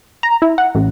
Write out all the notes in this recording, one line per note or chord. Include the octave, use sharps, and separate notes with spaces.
A#5
E4
F#5
A1